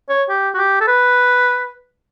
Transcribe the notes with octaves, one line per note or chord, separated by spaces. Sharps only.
C#5
G4
F#4
G4
A4
B4